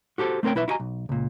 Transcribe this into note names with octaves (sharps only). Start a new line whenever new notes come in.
F#4 G4 A4 C5
A3 C4 A#4 C#5 G5
B1 E4 B4 E5
E4 F#4 G4 D#5 G#5 A#5
B1
C#2 A#2